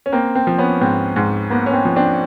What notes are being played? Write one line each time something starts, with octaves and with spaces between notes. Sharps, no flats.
C#4
A#3 C4
C4
F3
B3 C#4
G#2 C4
G#2
A#3 B3
C#4
C4
F3
C4 D4